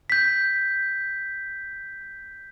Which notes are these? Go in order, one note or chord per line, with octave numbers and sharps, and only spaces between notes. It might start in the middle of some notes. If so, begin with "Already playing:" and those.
G6 B6